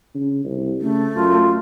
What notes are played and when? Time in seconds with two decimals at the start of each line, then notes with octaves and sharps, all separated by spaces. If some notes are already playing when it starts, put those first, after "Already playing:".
0.15 C#3
0.45 C2
0.81 C#3 A3
1.16 F#2 F4